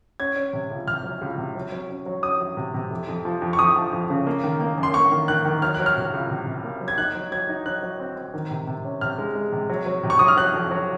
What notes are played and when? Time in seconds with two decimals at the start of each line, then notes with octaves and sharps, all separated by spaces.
0.20 C#4 G#6
0.36 C#4
0.53 C3
0.71 C#2
0.87 C3 F6
1.04 F#3
1.21 C#2
1.38 C3
1.55 F#3
1.72 F#3
1.89 C#4
2.06 F#3
2.23 C#4 D#6
2.40 F#3
2.57 C3
2.74 C3
2.91 F2
3.08 F2
3.25 F3
3.42 F2
3.53 C#6
3.59 F2 D#6
3.76 F3
3.93 F2
4.10 C#3
4.27 A#3
4.44 D#3
4.60 A#3
4.78 F#2
4.83 C6
4.94 A#3 C#6
5.12 D#3
5.28 D#3 F#6
5.45 D#3
5.62 F#3 F6
5.74 F#3 F#6
5.86 F6
5.96 C3
6.13 C#2
6.30 C3
6.47 C3
6.64 A#3
6.81 F#3
6.88 G#6
6.98 D#4 F#6
7.15 F#3
7.32 F#3 G#6
7.49 D#4
7.66 F#3 F#6
7.83 F#3
8.00 C4
8.16 C4
8.34 D#3
8.51 C3
8.67 C3
8.85 C#4
9.01 C3 F6
9.18 G#3
9.35 G#3
9.52 C3
9.70 F#3
9.86 F#3
10.03 C3
10.10 C#6
10.19 F#3 D#6
10.28 F6
10.37 F#3 F#6
10.54 F2
10.71 F#3